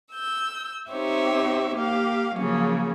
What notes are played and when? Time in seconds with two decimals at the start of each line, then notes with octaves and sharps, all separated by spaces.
0.11 E6 G6
0.90 C4 D#4 G4 C5 C#5 E5
1.76 A#3 G4 F5
2.33 C#3 F3 F#3 A#3 C#4